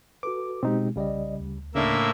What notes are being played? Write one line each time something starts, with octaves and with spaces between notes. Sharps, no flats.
F#4 A4 B4 D6
B2 G#3 C4 D#4 G4
B1 C#3 G3 D5 D#5
D2
A2 C#3 A#3 D4 E5